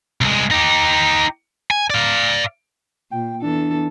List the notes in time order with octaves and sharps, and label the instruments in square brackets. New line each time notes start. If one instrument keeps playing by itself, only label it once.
[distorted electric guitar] C2 G#3
D#4 G4
G#5
D5 F5
[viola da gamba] A#2 [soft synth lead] G5
[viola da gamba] E2 E3 A4 [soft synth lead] D4